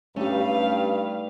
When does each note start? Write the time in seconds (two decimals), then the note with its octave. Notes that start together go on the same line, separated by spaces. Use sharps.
0.16 G2 A3 C#4 D#4 G4 A4 B4 F5